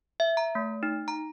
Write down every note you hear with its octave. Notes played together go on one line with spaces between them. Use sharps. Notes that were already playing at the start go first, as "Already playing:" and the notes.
E5
A#5
A3
D#4
A#5